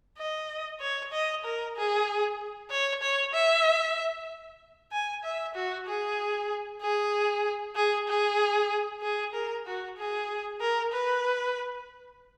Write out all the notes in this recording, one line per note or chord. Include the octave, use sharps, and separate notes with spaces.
D#5
C#5
D#5
A#4
G#4
C#5
C#5
E5
G#5
E5
F#4
G#4
G#4
G#4
G#4
G#4
A#4
F#4
G#4
A#4
B4